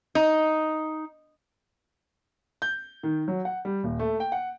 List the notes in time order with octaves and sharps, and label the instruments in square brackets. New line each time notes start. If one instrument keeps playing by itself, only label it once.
[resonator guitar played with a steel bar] D#4
[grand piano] G6
D#3
F#3
F#5
G3
D#1
A3
G5
F#5